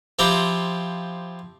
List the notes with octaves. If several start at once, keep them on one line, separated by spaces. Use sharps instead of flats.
F3 C4 E4 G4 A#5